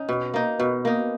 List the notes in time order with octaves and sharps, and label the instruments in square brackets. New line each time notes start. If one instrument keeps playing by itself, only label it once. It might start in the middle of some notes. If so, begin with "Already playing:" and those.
Already playing: [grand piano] C#4 [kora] D#4
[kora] B2
A#3 D#4
[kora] B2 [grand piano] B3
[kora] A#3 D#4